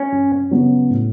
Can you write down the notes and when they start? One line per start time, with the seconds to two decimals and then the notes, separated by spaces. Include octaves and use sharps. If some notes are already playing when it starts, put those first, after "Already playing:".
Already playing: C#4
0.12 F#2
0.51 C#3 F#3 B3
0.90 A2